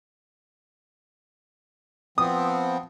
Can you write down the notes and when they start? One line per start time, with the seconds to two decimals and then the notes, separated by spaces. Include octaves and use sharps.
2.18 F3 B3 C4 D#6